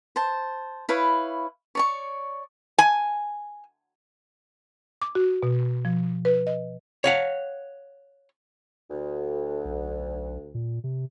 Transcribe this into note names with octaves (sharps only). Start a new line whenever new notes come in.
C5 A5
E4 B4 C#5 F5
C#5 D5 C#6
G#5
D6
F#4
B2
F3
B4
D#5
C#5 F5 F#5
D2
B1
A#2
C3